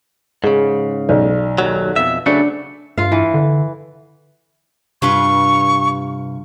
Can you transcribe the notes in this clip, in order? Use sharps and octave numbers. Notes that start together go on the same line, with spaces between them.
G#2 C#3 G#4
B1 D5
D#2 F#3
F2 B2 E5
C#3 F#3 A3 D4 C#7
G2 F4 F5
E3
D3
G2 C3 F4 B4 C#6